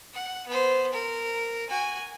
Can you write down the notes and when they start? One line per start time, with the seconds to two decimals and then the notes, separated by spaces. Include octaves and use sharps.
0.14 F#5
0.47 B3 C5
0.93 A#4
1.69 F#4 G#5